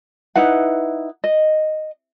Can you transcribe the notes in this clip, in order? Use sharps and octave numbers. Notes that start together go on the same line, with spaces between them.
D#4 E4 B4 F#5
D#5